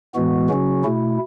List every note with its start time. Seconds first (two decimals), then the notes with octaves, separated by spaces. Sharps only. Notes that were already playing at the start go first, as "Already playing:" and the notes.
0.14 A2 E3 G#3 B3 F#4
0.49 C#3 F#3 C#4 F#4
0.84 B2 A3 E4